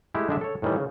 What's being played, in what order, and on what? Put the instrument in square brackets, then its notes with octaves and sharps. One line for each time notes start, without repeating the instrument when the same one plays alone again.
[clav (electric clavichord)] G#3 A3 E4 G4
D3 G#3 D4 E5
A4 C#5
A2 D#3 E3 G3
C#3